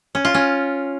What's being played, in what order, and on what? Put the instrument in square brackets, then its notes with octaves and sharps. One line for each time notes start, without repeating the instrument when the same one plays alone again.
[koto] C#4
F4
C#4